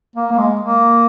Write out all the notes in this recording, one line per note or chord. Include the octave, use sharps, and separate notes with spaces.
A#3
A#3
G#3
A#3